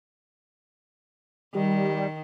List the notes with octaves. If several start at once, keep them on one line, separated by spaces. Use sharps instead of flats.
D#3 G3